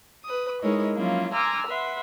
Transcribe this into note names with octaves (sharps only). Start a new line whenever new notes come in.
B4 D#6
G#3 D#4 E4 A#4 C#5 D#5
F3 F#3 A#3 C#4 E4 F4
G#5 A#5 C6 D6 E6 F6
B4 E5 F#5 C6